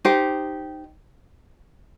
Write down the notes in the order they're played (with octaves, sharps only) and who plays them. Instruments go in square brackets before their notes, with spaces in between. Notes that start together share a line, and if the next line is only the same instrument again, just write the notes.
[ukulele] D#4 G4 C5